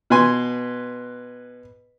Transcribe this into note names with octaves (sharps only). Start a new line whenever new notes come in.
B2 B4 G#5 C6